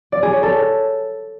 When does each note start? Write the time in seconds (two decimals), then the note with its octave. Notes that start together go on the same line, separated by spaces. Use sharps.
0.12 D5
0.23 G#4
0.33 C#5
0.43 A4